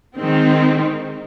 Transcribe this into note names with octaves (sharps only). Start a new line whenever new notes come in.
D#3 G#3 C4